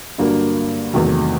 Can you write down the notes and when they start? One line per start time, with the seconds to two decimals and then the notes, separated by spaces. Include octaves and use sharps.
0.18 G2 D3 F#3 A#3
0.94 E2 C3 D#3 F#3 A3